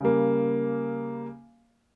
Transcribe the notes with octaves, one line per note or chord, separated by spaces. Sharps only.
C#3 G3 A#3